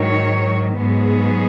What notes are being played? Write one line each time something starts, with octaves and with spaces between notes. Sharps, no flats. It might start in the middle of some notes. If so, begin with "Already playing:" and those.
Already playing: G#2 D#3 F#3 C#5
G#2 F#3 B3 G#4